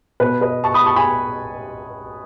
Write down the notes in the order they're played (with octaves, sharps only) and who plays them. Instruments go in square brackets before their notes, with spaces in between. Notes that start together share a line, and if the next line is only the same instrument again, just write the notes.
[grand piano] B2 B4
B4 D#5
A5 C#6
B5 D#6
A5 C#6
G#5 B5